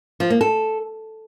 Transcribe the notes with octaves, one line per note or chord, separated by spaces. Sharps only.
F3
A#3
A4